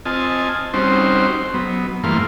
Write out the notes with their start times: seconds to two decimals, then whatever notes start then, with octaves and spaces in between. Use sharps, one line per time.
0.06 C4 F4 D#5 G#5 A5
0.74 G3 C4 C#4 D#4 F#4 C5
1.54 F#3 B3
2.04 G2 E3 A3 A#3 F5 C6